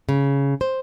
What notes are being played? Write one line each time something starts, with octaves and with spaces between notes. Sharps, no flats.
C#3
C5